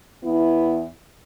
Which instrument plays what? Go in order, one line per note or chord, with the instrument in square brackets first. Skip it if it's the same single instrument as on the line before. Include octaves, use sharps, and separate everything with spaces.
[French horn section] E2 B3 E4